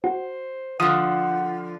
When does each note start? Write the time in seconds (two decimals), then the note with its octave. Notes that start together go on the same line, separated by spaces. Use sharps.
0.04 F#4 C5
0.80 D3 F3 F#5 D#6